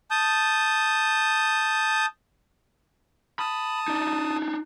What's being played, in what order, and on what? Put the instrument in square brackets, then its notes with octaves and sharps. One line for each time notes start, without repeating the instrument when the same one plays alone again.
[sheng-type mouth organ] A5 D#6 G6
[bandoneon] A5 D#6 [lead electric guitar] B5
[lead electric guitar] D4 D#4